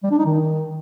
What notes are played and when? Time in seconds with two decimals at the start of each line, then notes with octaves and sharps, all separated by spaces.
0.04 G3
0.11 D4
0.18 D#4
0.26 D#3